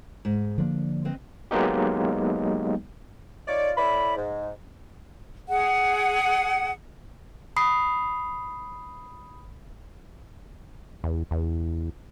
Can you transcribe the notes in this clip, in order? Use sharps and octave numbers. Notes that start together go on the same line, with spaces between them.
G#2
D3 F3 A#3 D4
C4 B4 D#5
F#3 G#3 A#3 B3 D#4 G4
D#4 F4 C#5 D5
A2 E4 D5 B5
G#2
G#4 F#5
B5 D#6 C7
E2
E2